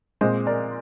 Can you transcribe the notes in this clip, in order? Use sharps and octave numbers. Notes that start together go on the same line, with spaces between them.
A#2 G#3 C4 C5 D#5
A#4 D5